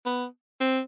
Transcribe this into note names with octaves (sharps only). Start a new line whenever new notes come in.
B3
C4